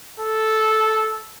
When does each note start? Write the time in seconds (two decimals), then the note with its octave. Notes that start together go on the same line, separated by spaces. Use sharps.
0.20 A4